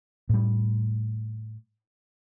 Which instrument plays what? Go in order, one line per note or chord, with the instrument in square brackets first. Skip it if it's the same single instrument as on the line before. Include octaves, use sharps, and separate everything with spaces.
[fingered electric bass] A2 G3